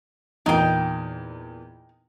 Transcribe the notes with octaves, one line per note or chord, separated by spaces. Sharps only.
E2 A#2 D#4 G5